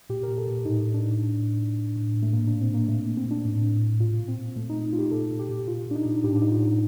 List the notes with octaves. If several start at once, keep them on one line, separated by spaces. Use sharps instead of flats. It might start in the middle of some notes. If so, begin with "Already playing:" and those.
A#2 G4
A#2 A#4
A4
A#2
A2 D#4
A2
D4
A2
A2
A2
A2
A2
A2
A2
A3
A#2 A#3
A#2 D4
C4
A#2 A#3
A#2 A3
A#2 A#3
C4
A#2
D4
A2
A2
A2
A#2 F4
A#2
C4
A#2
A#2 A3
D#4
A#2
A#2 F4
G4
A#2 A4
A#2
G4
A#2
A#2 F4
A#2 D4
D#4
A#2
A2 G4
D4
A2 D#4
F4
A2